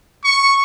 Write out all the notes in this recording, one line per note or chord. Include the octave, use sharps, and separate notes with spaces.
C#6